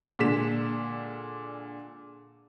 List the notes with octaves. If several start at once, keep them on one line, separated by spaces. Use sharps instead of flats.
A#2 D3 G#3 B6 E7